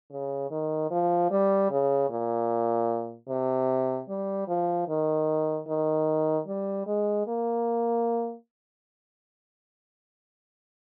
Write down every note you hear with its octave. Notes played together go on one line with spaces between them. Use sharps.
C#3
D#3
F3
G3
C#3
A#2
C3
G3
F3
D#3
D#3
G3
G#3
A#3